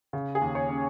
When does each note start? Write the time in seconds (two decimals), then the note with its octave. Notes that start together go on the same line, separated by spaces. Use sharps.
0.13 C#3
0.35 G#4
0.42 D#2
0.55 C#5
0.70 C#4